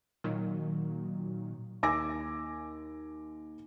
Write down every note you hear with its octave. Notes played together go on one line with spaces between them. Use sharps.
A#2 D#3 F#3
D#2 G#5 D6 E6 A#6